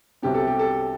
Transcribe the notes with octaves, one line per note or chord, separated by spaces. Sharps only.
C2 C3 F#3 B3 G4
A4
G4
A4